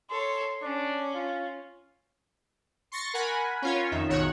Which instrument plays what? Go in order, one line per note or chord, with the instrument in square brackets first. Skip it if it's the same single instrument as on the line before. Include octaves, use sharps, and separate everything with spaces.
[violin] A4 C#5 [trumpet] C6
[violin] C#4 [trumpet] D4
[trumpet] F4
[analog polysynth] C6 C#6 A6 A#6 C#7
A#4 F#5 G#5 B5
C#4 F4 C#5
F2 D#3 D#4 E5
B1 G#2 D#3 F#4 C#5 F#5